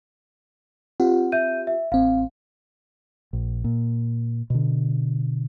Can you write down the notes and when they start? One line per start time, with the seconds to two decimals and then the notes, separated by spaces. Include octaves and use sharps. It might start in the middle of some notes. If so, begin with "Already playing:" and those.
1.00 C4 F4 G4 F#5
1.32 E5 G6 D#7
1.67 E5
1.92 A1 C4 F5
3.33 A#1
3.64 A#2
4.50 B2 D3